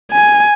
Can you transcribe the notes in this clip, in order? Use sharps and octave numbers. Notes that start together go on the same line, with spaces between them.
G#5